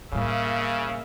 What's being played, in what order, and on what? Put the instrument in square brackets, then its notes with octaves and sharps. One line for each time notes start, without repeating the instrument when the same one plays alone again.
[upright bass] A2 G3 [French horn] C#3 [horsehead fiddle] A#3 E5